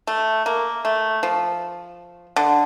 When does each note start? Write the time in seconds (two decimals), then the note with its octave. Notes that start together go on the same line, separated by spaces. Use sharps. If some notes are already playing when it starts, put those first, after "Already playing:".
0.07 A3
0.46 A#3
0.85 A3
1.23 F3
2.36 D3